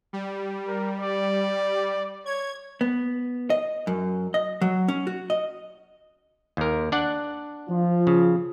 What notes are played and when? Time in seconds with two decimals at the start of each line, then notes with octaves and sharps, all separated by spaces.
0.13 G3
0.67 A#4
1.00 D5
2.26 C#5 G#6
2.81 B3
3.50 D#5
3.87 F#2
4.34 D#5
4.61 F#3
4.88 C#4
5.07 F#4
5.30 D#5
6.57 D#2 A#4
6.92 D4 D5 F#5
7.69 F3 F4
8.07 C#3